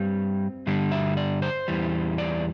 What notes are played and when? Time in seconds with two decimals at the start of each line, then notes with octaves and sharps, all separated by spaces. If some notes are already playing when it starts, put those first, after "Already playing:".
Already playing: G2 G3 C4
0.67 G2 D3 G3 D4
0.92 E5
1.17 D5
1.42 C5
1.68 E2 E3 G3
2.18 D5